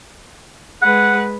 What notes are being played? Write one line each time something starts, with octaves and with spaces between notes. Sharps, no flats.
G#3 B4 F#5